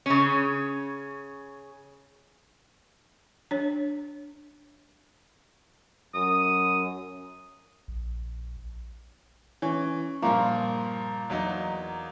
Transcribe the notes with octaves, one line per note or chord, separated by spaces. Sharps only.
C#3 C#4
D4 C#5
F#2 D#6
A#1
E3 C#4
G2 A#2 F3 A#3 C6
E2 F#3 D#4